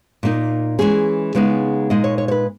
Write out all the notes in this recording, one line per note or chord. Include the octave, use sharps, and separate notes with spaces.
A#2 A#3 D#4
E3 G#3 C#4 G#4
C#3 G#3 B3 D#4
A#2 G#3 D#4 D#5
C#5
C#5
C#5
B4